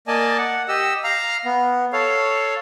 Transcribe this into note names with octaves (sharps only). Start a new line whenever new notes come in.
A#3 D5 D#5 G#5 A5
F#5
G4 D#5 E6
F5 A#5 F6
B3
A4 C#5 F5